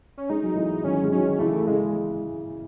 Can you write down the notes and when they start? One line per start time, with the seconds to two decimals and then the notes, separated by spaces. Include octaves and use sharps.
0.18 C#4
0.30 G#3 D#4
0.43 F#3
0.56 E3 G#3
0.84 D#3 F#3 C#4
1.04 G#3
1.12 D#3 F#3 C#4
1.39 C#3 E3 A3
1.67 C#3 E3 G#3